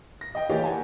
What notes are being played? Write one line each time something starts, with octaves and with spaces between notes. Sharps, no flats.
A#6
D#5 G5
E3 A#3 G4 C#5 D5
F#5 G#5 A5